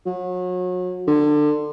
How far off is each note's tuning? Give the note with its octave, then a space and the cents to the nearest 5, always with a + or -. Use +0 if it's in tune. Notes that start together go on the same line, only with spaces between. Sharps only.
F#3 -35
D3 +25